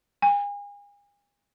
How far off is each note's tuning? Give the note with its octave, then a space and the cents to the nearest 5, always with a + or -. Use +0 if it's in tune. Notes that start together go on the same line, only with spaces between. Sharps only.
G#5 -35